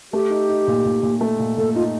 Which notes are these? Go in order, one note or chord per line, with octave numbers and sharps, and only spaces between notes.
A3 G4
D#4
D#4
A#2
A#2
A#2
A3
A#2
A#2 A4
D#4 F4